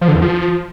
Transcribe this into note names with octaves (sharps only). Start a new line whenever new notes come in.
F3
D3
E2
F3